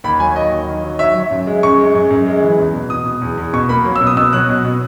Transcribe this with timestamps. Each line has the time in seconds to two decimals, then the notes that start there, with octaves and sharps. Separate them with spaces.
0.04 D#2 B5
0.20 F#3 G#5
0.36 F#3 D#5
0.52 D#2
0.68 D#3
0.84 F#3
0.99 F#3 E5
1.15 F#3
1.31 F#2
1.47 G#3
1.63 F#2 C#6
1.79 G#3
1.95 F#2
2.10 F#2
2.27 G#3
2.42 E3
2.58 E2
2.74 B2
2.90 B2 D#6
3.06 B2
3.22 E2
3.38 E2
3.53 B2 C#6
3.69 A#3 B5
3.85 F#3
3.96 E6
4.01 B2
4.07 D#6
4.17 B2 E6
4.33 F#3 F#6
4.49 B2
4.64 B2